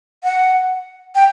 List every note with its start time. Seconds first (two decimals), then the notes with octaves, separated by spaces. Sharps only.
0.24 F#5
1.15 G5